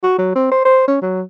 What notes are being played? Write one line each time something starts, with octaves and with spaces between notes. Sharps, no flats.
F#4
F#3
C4
C5
C5
C#4
F#3